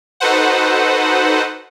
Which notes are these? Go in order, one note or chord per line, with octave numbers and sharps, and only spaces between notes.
D#4 F#4 A4 B4 C5 F#5